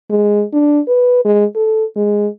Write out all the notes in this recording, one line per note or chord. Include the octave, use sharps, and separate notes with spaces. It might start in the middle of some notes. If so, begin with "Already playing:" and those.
G#3
D4
B4
G#3
A4
G#3